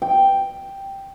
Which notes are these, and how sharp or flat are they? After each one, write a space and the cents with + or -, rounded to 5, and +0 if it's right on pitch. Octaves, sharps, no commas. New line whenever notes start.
G5 +0